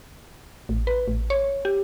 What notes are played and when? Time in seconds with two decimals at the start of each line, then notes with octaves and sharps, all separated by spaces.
0.69 A1
0.87 B4
1.08 A1
1.30 C#5
1.65 G4